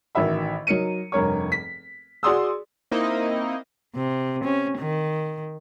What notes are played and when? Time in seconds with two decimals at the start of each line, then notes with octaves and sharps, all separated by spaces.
0.15 A1 D#3 F#4 E5 B5
0.67 F#3 D#4 A#4 C#7 D#7
1.12 F1 G2 A#4 C#5 C#6
1.52 B6
2.23 F#4 G#4 D5 C6 D#6 E6
2.91 A#3 C4 D#4 E4 D#5
3.95 C3
4.44 C#4
4.78 D#3